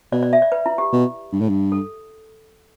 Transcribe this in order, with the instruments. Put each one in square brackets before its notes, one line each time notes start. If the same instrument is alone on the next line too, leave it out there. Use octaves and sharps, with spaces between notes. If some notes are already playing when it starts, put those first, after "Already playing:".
[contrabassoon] B2 [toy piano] D5
[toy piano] D5
E5
D5
B4
E4
G4
[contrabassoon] B2
G2
A2
G2
[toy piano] A4